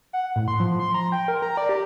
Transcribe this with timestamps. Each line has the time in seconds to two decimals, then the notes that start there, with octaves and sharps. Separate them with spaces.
0.13 F#5
0.36 A2
0.48 C6
0.60 F3
0.79 C6
0.94 A#5
1.12 G5
1.28 A#4
1.42 A#5
1.57 D5
1.69 G4